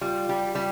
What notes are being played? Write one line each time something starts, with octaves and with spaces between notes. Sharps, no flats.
G3 F4
G3 G4
G3 G4